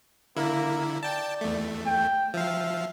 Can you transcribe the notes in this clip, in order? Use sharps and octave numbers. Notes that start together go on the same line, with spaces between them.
D3 A#3 E4
D5 G5 A5
E2 A3
G5
F3 E5 F5